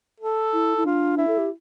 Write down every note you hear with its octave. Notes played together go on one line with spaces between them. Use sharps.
A4
E4
E4
D4 F4
E4
A4
G4